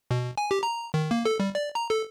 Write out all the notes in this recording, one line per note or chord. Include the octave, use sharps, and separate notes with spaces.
B2
G#5
G4
A#5
D#3
A#3
A4
G3
D5
A#5
A4